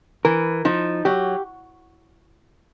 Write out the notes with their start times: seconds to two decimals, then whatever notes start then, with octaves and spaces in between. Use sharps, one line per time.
0.25 E3 A#4
0.65 F3 D#4
1.05 F#3 G4